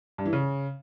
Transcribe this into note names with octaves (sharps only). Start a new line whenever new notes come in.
G2
E3
C#3